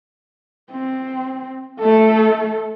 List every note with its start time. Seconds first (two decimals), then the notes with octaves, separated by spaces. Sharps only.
0.71 C4
1.80 A3 A4